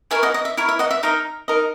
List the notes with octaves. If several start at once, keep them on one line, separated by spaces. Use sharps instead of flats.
E4 A#4 C#5 E5 G#5
D#5 F#5
D#5
E5
E4 A#4 C#5 E5
E5
D#5 F#5
E5
D#4 A#4 D#5 E5
D#4 A#4 D#5